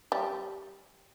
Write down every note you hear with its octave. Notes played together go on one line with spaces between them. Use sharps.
G3